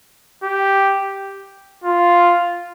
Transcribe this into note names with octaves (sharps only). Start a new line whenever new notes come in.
G4
F4